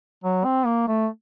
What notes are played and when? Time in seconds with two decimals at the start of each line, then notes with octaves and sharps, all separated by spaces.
0.24 F#3
0.45 C4
0.66 A#3
0.88 A3